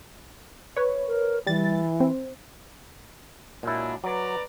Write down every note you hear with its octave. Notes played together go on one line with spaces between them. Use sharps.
B4 C#5
A#4
E3 G3 A6
C4
A#2 F#3 G#3 D4 E4
F#3 B4 D5 A#5